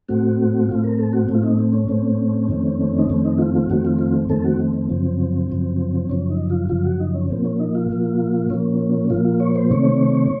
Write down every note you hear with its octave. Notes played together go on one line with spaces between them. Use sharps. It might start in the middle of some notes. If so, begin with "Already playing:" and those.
A2 A3 C4 F#4
A2 A3 C4 F4
A#4
A4
F#4
A2 A3 C4
F4
D#4
C4
C#4
A2 A3 C4
F2 D#3 A3 C4
D#4
F2 D#3 A3 C4 C#4
D#4
F4
F4
F2 D#3 A3 C4 F#4
F4
F4
F2 D#3 A3 C4 A4
F#4
C4
C4
F#2 C#3 F3 C4
F#2 C#3 F3
F#2 C#3 F3 C#4
D#4
F4
F#2 C#3 F3 F4
F#4
D#4
C#4
A#2 F3 A#3 C4
C#4
D#4
F4
A#2 F3 A#3
A#2 F3 A#3 C#4
A#2 F3 A#3 F4
F4
C#5
C5
C3 D#3 A3 C4 C#5